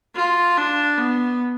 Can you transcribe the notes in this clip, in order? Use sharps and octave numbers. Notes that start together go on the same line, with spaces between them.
F4
D4
B3